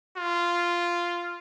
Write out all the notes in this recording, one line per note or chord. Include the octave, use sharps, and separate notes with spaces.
F4